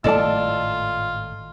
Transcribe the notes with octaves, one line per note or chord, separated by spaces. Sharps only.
G#1 A2 A3 F4 A4 D5 D#5 A5